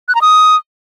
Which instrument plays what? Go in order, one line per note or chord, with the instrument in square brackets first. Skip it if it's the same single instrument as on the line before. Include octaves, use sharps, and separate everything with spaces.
[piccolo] F#6
A#5
D#6